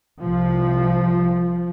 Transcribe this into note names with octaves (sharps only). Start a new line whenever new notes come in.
C2 C3 F3